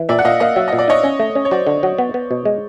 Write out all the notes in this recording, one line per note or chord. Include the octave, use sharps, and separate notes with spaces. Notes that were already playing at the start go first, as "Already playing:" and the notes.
Already playing: E3
A#2 D5 E5
F#5
A#2 D#5 F5
A#3 D#5 F5
F#3 E5
A#2 D#5
D5
D#4 C#5 D#5
C#4
A3
C#4
C#5
F#3 C5 D5
D3
F#3
B3
B3
B2
G#3